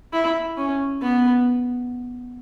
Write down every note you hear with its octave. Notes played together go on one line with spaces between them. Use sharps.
E4
C#4
B3